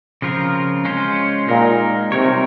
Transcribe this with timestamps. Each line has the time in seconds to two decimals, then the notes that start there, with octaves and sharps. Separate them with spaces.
0.22 C#3 F3 C4 F4 A#4
0.85 G#3 C#4 F4 C5
1.48 A#2 G#3 D#4 A#4
2.12 C3 G3 C4 D#4 A#4 C#5